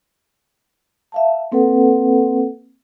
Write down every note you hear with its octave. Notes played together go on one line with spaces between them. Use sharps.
E5 F5 A5
A#3 C4 A4 B4 F#5